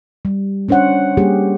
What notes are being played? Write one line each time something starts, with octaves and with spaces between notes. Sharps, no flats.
G3
C#4 D4 C5 C#5 F#5
G3 A#3 G4 G#4